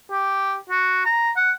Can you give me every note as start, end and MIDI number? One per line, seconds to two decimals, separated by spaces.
0.11 0.56 67
0.70 1.04 66
1.05 1.30 82
1.36 1.52 78